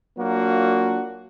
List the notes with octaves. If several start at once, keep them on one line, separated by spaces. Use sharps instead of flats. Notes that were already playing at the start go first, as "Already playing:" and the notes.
F#3 A#3 D4 F4 F#4